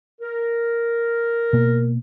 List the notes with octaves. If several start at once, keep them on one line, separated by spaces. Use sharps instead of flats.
A#4
B2 A#3